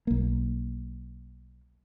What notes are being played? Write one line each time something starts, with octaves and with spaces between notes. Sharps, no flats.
B1 A#3